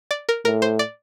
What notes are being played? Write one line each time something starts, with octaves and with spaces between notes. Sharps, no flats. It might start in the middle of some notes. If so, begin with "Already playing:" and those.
D5
A#4
A2 A#4
C5
D5